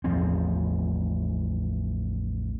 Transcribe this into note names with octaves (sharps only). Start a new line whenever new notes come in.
A1 E2 F3 C4